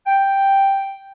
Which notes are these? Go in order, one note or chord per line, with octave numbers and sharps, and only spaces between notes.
G5